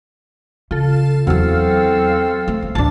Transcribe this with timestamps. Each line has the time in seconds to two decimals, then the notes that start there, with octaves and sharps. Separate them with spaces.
0.71 C#3 F4 A4
1.27 E2 F#3 C4 E4 A4 F5
2.48 A3
2.62 C#2
2.75 A1 D2 D4 A5